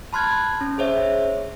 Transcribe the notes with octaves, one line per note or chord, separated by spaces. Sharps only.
A5 B5 C6 F6 F#6 G#6
C#4
G#4 C5 C#5 E5